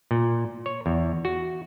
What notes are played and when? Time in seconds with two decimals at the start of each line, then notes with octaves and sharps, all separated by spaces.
0.11 A#2
0.66 C#5
0.86 E2
1.25 F#4